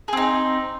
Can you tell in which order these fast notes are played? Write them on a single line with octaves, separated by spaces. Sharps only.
G#4 C4 D#4